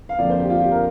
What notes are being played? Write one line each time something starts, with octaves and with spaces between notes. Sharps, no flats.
F5
F2 D3 F3 A#3 D5
C5
G4
F4
G4
A#4